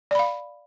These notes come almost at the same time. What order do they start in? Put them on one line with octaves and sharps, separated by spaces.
D5 B5 F5